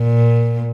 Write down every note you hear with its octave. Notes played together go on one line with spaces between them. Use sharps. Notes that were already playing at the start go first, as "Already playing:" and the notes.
Already playing: A#2